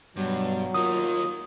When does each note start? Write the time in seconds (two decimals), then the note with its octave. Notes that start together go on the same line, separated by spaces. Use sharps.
0.16 G2 B2 F#3
0.74 D#3 A#3 F4 D#6